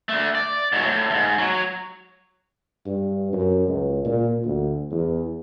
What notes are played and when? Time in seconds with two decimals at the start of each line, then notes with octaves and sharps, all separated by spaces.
0.09 A3 D4
0.35 D5
0.72 G#2 F#3
0.86 A2
1.10 D2 G#2
1.38 F#3
2.86 G2
3.33 F#2
3.68 C#2
4.05 A#2
4.45 D2
4.91 E2